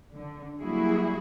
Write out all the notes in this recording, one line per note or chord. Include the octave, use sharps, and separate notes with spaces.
D3
F#3 G3 A#3 E4 F#4 G#4